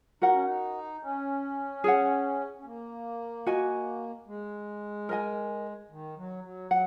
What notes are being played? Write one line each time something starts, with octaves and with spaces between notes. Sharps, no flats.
D#4 F#4 A#4 F#5
C#4
D#4
C#4
G#4 C#5 F#5
C#4
A#3
F#4 D#5 G#5
G#3
A#4 D#5 G#5
D#3
F#3
F#3
F#3 F#5